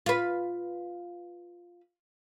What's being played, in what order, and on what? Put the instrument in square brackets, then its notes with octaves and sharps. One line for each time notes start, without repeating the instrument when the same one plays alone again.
[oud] F4 B4